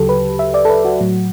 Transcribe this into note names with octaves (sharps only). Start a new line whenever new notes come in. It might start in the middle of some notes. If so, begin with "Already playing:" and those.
Already playing: D2 C#3 F#3 G4 A4
B4
E5
D5
A4
B4
F#4
A2 F#3